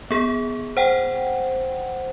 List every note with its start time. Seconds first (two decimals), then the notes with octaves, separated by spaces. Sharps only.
0.11 B3 G#4
0.77 C5 F#5 G5